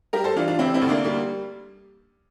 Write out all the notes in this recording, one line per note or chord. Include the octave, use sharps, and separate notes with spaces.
G3 G4 A#4
A4 C5
E3 D4 F4
D4 F4
C3 C4 E4
C4 E4
D2
A#3 D4
G3 A#3